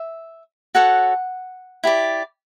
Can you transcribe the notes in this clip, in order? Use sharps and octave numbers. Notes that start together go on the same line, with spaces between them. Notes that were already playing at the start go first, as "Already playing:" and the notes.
Already playing: E5
F#4 A4 C#5 F#5
E4 G4 D5